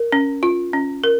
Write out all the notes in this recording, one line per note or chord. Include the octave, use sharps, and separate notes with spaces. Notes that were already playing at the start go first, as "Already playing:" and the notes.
Already playing: A#4
C#4
F4
C#4
A#4